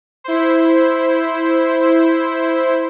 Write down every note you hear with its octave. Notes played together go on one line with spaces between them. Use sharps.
E4 C5